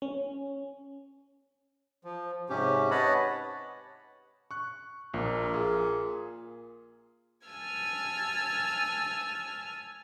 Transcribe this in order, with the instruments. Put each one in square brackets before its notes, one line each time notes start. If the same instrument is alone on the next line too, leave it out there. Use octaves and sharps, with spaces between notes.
[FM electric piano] C#4
[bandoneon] F3
G#2 C3 C#4 G4
B4 C#5 D#5 F#5 A5 B5
[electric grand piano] C#6 F#6
[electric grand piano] A#1 [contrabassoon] A#2
[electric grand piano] F4 G#4
[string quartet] G#5 A5 E6 F6 G#6